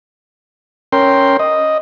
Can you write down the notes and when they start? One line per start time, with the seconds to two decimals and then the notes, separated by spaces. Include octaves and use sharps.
0.92 C#4 A#4 G5 C6
1.39 D#5